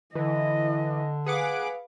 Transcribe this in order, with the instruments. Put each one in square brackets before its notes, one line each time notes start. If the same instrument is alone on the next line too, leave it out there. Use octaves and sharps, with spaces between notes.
[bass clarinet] D3 [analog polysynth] E3 [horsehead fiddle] D#5
[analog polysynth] G#4 F#5 D6 [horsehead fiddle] B4 F5